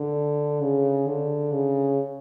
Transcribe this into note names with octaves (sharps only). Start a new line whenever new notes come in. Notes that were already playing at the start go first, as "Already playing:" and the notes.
Already playing: D3
C#3
D3
C#3